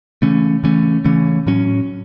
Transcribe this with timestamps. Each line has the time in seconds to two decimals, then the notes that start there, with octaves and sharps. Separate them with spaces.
0.22 C#3 E3 A3 C#4
0.64 C#3 E3 A3 C#4
1.05 C#3 E3 A3 C#4
1.46 A2 F#3 C#4